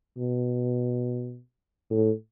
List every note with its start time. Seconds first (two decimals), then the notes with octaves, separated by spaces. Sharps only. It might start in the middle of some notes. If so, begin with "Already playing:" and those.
0.17 B2
1.90 A2